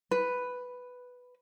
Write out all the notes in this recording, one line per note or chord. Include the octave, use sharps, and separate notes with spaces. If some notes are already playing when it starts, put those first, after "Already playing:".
B4